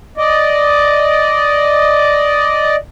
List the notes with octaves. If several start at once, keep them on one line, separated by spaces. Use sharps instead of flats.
D5 D#5